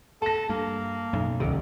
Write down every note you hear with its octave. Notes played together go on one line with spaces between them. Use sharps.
A4 A5 A#6
G2 A#3
B1 F#2
D#1 C#2 C3 D#3